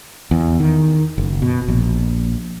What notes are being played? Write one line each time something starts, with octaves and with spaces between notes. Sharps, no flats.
E2
D#3
F#1
B2
A#1